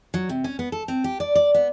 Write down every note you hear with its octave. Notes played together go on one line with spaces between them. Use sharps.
F#3
C3
C#4
B3
A4
C4
G4
D5
D5
B3